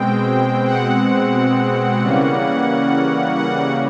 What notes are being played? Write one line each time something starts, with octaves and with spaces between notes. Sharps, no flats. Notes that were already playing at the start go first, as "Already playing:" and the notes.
Already playing: B2 G#3 C4 G5
F#5
C#3 E3 G3 A#3 C#4
F#5